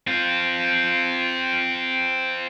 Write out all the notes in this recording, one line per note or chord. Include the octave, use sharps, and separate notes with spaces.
C4 F4